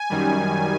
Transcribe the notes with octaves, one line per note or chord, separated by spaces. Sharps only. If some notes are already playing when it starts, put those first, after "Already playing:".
Already playing: G#5
F#2 D#3 G3